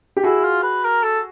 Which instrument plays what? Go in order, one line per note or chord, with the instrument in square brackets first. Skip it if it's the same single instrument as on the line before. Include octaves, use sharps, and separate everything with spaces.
[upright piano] G4
[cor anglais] E4 [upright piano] F#4 G#4
[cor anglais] F4
B4
A#4
A4